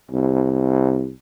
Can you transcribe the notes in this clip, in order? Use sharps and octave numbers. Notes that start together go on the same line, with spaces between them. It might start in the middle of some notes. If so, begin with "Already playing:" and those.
C2